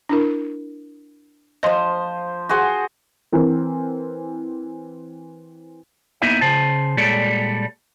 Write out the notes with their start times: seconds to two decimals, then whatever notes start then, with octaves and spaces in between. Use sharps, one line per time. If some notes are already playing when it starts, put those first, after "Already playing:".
0.09 D4 E4 A#4
1.63 F3 C5 D#5 C6
2.49 F#4 G#4 C5
3.32 E3 C4 A#4
6.22 A#3 B3 D#4 E4 B4 E5
6.41 C#3 C5 A5
6.97 A#2 G3 G#3 A4 C#5 D5